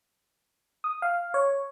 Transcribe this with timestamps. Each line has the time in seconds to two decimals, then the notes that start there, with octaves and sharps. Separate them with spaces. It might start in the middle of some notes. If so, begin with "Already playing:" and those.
0.84 D#6
1.02 F5
1.34 C#5